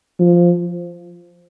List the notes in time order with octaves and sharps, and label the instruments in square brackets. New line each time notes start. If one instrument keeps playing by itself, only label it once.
[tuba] F3